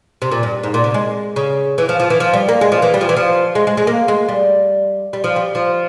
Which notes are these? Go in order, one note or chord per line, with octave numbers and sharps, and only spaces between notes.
C3
A#2
G2
G#2
A#2
C3
G#3
C#3
E3
F3
F3
E3
F3
G3
A#3
G#3
F3
E3
G3
F3
E3
F3
G#3
G#3
G#3
A#3
G#3
G3
G3
F3
G3
F3